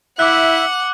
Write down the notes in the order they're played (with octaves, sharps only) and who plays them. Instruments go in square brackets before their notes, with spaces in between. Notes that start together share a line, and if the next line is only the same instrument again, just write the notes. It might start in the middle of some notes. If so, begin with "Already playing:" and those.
[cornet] E4 [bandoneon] E5 [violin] F#5 [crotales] D6 F#6